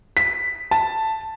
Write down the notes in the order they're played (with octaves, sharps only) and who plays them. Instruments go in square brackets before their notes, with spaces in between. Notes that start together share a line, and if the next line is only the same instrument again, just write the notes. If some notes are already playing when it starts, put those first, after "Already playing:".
[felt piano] B6
A5